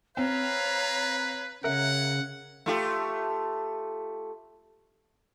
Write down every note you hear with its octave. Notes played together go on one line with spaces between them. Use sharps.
C4 B4 C#5 F5 A#5
C#3 A#4 C#5 E5 F#5
A3 F4 G4